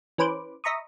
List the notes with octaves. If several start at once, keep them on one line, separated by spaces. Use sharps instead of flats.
E3 C#4 B4 C5 D6
D#5 E5 A#5 B5 C#6 D#6